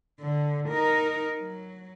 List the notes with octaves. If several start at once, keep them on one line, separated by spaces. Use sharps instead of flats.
D3
D#4 A#4
F#3